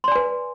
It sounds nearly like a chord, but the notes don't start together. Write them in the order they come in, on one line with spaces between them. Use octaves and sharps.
C6 D5 G#5 B4